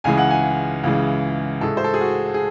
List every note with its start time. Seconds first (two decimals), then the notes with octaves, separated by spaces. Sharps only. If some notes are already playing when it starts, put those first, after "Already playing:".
0.04 C#2 C#3 E3 G#3 G#5
0.18 F#5
0.30 G#5
0.83 C#2 C#3 E3 G#3
1.61 A2 G#3 A4
1.77 C5
1.84 A4
1.94 G#4
2.01 F#4
2.34 G#4